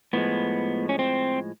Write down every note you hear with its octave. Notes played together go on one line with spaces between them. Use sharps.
A2 F3 G#3 B3
C#4
C4